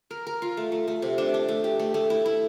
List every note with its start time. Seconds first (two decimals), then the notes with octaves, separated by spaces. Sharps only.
0.11 A#4
0.27 A#4
0.42 F4
0.57 A3
0.72 A3
0.88 A3
1.02 C3
1.18 D4
1.34 D4
1.49 A3
1.64 G4
1.79 A3
1.94 A3
2.10 E4
2.26 E4